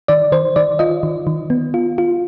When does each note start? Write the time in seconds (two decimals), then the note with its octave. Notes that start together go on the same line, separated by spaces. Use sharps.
0.08 D#3 D5
0.32 D#3 C5
0.56 D#3 D5
0.79 F4 D#5
1.03 D#3
1.27 D#3
1.50 B3
1.74 F4
1.98 F4